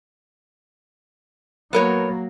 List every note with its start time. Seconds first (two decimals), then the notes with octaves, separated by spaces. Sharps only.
1.73 F#3 A#3 B3 A#4 C#5